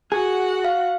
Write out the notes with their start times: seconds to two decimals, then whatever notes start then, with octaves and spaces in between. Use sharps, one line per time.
0.12 F#4 G#4 F#5
0.65 F5